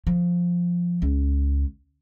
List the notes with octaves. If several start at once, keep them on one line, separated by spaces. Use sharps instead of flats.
F3
C#2